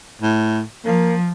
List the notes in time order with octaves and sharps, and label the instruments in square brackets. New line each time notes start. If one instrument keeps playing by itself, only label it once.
[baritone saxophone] A2
[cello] F3 [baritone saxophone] A#3